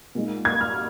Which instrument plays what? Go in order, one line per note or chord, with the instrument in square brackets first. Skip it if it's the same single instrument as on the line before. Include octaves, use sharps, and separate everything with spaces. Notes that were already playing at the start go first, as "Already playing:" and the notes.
[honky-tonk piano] A#2 G#3 D#4
G#6
F6